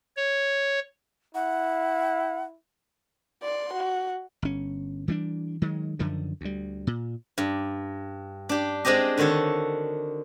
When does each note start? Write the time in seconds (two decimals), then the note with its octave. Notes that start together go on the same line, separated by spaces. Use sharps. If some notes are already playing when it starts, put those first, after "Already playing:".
0.17 C#5
1.35 E4 F#5
3.42 D5 C6
3.73 F#4
4.42 G1 C#4
5.08 E3 G3 C4 D4
5.62 D#3 F#3 G#3
5.99 F#2 D3 D#3 F3
6.41 D2 G3
6.87 A#2
7.38 G2
8.49 D4 G4
8.85 G#3 C4 D4 G4 D#5
9.17 D3 D#3 F#4 A4 C#5